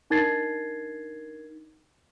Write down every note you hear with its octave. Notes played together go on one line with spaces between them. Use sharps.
D4 D#4 A#4 G#6 A6 C7